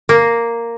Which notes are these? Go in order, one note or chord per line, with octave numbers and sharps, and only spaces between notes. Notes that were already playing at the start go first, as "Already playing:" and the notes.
A#3